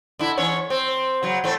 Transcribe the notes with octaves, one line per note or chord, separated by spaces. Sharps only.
D3 E4
E2 C#4 C#5
C4
C#3 F#3
A2 A3 C4